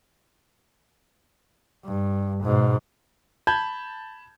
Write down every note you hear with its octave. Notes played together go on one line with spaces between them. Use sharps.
G2
G#2 B2
A5 B5 G6 G#6